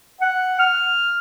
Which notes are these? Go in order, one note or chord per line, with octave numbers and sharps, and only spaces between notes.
F#5
F6